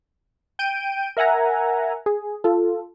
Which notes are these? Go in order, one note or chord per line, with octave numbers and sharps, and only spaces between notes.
G5 G6 D7 D#7
A#4 E5 F#5 G#5 A#5
G#4
F4 A4